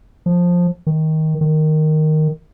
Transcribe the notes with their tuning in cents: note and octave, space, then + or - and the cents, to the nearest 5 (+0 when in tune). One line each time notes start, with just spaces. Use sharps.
F3 +10
D#3 +15
D#3 -5